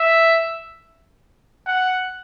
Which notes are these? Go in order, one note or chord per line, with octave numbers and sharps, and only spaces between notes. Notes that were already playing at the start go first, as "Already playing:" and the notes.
Already playing: E5
F#5